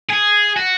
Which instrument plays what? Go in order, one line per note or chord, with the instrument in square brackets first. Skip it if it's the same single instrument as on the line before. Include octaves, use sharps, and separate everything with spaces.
[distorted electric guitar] G#4
F#4